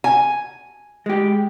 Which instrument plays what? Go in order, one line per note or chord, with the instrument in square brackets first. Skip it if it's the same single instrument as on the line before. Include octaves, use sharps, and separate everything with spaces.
[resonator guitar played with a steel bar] G#5
[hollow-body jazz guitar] G#3 G4